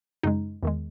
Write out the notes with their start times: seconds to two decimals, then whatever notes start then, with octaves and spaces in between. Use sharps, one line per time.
0.23 F#2 C#3 G#3 D#4
0.63 E2 D#3 G#3